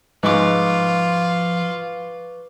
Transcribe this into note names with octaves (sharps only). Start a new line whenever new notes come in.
G#2 F3 F4 B4 C#6 D6